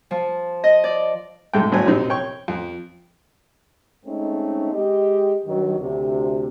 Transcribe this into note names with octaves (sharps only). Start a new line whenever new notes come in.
F3
D#5
D5
B1 G#2 G#3 A3 G5
G#1 A2 F#3 C5 G#5
A#1 F#2 C3 C4 D#4
C#5 G5 C#6
F2
G#3 A3 C4 C#4 D#4
G#3 G4 D#5
G2 D#3 F#3
D2 C3